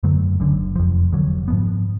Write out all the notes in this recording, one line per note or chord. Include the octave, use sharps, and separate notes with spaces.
F#2 D3 F#3 A3
F#1 F#2 D3
F1 F2 F3
F1 F2 D3 F#3
G#2 F3 B3